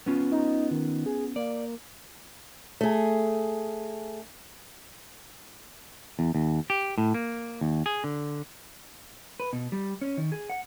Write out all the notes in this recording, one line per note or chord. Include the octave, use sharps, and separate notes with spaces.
B3 C#4 F4
D#4
D#3
G#4
A#3 D5
A3 G#4
E2
D#2
G4
A2
A#3
D#2
G#4
D3
B4
B2
G3
C#4
D#3
G#4
F#5